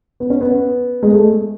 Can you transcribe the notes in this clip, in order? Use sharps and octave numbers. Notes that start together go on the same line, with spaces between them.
B3
C#4
B3
G#3
A3